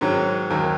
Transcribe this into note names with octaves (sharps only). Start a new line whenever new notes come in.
G#2 D#3 F#3 C#4
D#2 D#3 F#3